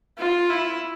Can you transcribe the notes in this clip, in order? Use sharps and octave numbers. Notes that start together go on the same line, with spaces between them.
F4
E4